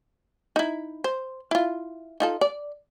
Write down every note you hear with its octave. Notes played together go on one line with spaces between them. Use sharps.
D#4 E4
C5
E4 F4
D#4 F4 A4
D5